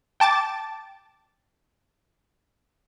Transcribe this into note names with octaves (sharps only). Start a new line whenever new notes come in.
G5 A5 D6 A6